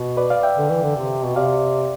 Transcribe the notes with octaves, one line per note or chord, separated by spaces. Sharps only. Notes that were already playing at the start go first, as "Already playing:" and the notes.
Already playing: B2
B4 D5
D5 F5
E5 G5
D3
E3
D3
C3
B2
C3 D5 F5